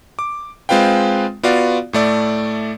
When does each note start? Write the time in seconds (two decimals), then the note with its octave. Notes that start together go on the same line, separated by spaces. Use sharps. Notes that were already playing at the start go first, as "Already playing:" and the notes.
0.19 D6
0.69 G#3 C4 F4 B4 F5 G5
1.43 B3 F4 F#4 D5 F5
1.93 A2 A3 D5